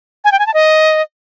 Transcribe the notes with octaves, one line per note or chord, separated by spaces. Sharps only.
G#5
G5
G#5
A5
D#5